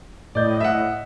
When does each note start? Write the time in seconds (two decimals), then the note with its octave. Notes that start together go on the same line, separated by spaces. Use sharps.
0.35 A2 D5 D#5 G6
0.60 E5 F#5